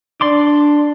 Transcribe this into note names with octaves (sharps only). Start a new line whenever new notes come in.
D4 D5 C6 D6